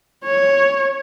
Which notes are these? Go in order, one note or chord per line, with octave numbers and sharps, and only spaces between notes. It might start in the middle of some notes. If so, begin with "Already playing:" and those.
C#5